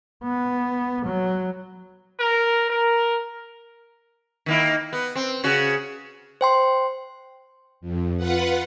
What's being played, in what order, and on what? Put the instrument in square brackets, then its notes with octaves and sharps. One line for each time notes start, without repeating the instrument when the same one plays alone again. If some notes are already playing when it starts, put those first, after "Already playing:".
[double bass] B3
F#3
[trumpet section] A#4
A#4
[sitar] D#3 A#3 E4
B3
C4
C#3 F#4
[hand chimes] C5 G5 C6
[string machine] F2
F4 B4 F#5